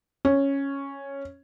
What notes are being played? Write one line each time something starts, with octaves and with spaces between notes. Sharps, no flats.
C#4